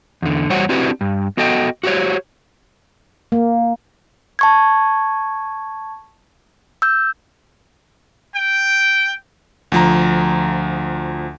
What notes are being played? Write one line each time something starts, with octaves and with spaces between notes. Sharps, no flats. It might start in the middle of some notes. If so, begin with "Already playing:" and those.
E2 D3
E2 G3 F#4 C5 C#5 F#5
C4 D4 E4 F#4 G4 B4
G2
B3 F#4 A4 D#5 G5
F#4 G4 C5 C#5
A#3
A5 C#6 G#6
E6 G6
G5
D2 F3 A#5